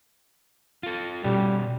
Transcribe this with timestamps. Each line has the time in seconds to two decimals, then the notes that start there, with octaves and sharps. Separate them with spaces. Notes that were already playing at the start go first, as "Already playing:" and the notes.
0.83 F4 A4
1.24 B2 G3 C#4 F#4